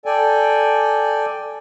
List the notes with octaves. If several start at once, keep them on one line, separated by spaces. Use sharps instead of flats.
A4 D5 G5 G#5